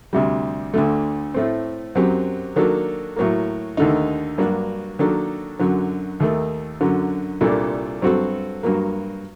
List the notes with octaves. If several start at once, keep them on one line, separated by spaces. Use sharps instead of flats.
D2 C3 G3
D2 D3 A3
A2 A3 C4
F#2 F#3 C4 G4
D#3 F#3 A#3 D4 A4
A2 F#3 A#3
D#2 D3 A3 D#4
G2 F#3 A#3 D4 F#4
D#3 F#3 A#3 D4 A4
F#2 D3 F#3
D#2 D#3 A3
F#2 D3 F#3
C2 A#2 G3 D4 A4
G2 F#3 C4 F#4 A4
G2 F#3 A#3